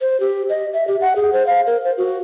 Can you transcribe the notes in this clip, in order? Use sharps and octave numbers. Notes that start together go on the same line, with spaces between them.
C5
G4
D#5
E5
G4
F#5
G#4
C5
F5
A#4
C5
F#4